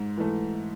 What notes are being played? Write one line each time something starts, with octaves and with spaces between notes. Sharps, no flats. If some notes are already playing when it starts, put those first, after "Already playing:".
Already playing: G#2
E3 A3